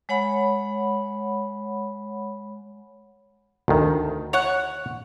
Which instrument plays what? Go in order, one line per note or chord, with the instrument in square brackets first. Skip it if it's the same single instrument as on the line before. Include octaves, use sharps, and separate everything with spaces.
[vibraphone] G#3 C#5 F#5 B5
[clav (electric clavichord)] D2 D#3
[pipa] C#5 F#5